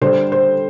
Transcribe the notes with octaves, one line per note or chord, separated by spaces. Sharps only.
D3 G3 C5
C5